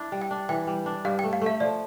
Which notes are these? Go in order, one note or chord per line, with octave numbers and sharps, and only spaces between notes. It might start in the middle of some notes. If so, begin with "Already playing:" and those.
Already playing: D4 E4
G3
G5
D4
E3 G5
G3
D4
G2 F5
A3 G5
F5
A3 E5
F3 D5